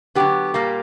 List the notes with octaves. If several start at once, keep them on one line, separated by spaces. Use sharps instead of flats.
D3 F#3 B3 G4
A#2 G3 A#3